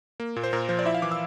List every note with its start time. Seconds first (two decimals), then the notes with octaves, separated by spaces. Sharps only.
0.20 A#3
0.36 A#2
0.44 C5
0.53 A#2 A#4
0.69 F3 C5
0.79 D5
0.85 E4 E5
0.94 F5
1.02 E3 D6
1.11 E6